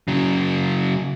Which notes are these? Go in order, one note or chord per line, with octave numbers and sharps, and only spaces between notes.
C#3 F#3